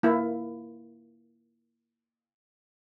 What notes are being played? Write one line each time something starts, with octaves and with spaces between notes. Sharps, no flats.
A#3 E4